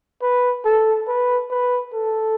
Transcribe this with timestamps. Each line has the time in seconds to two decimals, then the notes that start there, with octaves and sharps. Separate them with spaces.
0.21 B4
0.64 A4
1.08 B4
1.50 B4
1.94 A4